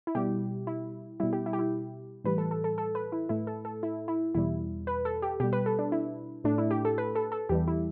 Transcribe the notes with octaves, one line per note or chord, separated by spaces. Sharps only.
E4
B2 G3 G4
E4
B2 G3 E4
G4
E4
G4
E4
A2 E3 G3 B4
A4
A4
A4
A4
B4
E4
A2 A3 E4
A4
A4
E4
E4
E2 B2 G3 E4
B4
A4
G4
B2 G3 G4
B4
A4
D4
E4
A2 A3 D4
E4
G4
A4
B4
A4
A4
E2 E3 G3 G4
E4